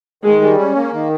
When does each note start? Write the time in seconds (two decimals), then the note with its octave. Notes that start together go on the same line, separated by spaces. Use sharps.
0.23 D#3 G#3
0.41 G3
0.59 C#4
0.76 A#3
0.93 D#3